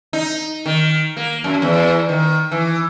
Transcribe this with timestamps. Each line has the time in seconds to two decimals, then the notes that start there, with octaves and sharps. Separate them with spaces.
0.13 D#4
0.66 D#3
1.17 A#3
1.44 F#2
1.62 E2
2.09 D#3
2.51 E3